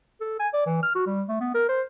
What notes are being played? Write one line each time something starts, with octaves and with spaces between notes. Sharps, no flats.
A4
G#5
D5
E3
F6
F#4
G3
A3
B3
A#4
C5